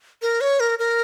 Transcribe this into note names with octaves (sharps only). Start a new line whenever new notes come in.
A#4
C#5
A#4
A#4